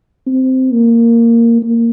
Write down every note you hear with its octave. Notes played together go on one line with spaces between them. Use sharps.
C4
A#3
A#3